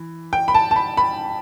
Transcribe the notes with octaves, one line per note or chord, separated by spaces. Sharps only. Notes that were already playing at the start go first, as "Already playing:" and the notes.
Already playing: E3
G5
B5
A5
A5
B5
B5